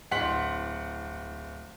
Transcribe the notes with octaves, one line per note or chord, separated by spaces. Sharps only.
D1 F#5 C6 B6 F#7